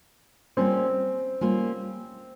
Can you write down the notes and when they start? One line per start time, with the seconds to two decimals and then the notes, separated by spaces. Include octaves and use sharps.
0.57 G3 A#3 C4 C#4 F4
1.41 G3 A#3 C#4 F4